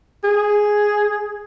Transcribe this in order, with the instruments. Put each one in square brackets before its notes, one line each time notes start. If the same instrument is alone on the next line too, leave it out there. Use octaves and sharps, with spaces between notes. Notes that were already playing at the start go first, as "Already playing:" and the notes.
[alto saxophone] G#4